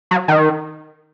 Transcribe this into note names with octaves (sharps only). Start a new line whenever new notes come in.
F#3
D#3